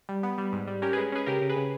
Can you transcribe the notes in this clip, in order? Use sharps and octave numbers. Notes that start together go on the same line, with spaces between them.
G3
B3
G3
G#2
G3
C#4 G4 A#4
G#3 G#4 B4
C#4 G#4 B4
C#3 G4 A#4
C#3
G#4 B4
C#3